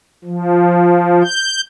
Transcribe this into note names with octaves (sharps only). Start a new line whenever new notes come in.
F3
G6